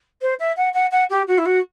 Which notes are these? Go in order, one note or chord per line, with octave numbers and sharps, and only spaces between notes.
C5
E5
F#5
F#5
F#5
G4
F#4
E4
F#4